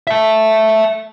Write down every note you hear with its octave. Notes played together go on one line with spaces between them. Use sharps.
E5 A5